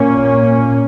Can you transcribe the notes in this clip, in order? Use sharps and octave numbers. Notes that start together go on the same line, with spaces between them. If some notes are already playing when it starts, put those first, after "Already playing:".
Already playing: A#2 A#3 C#4